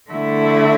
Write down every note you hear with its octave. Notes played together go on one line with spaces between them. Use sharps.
D3 A3 E4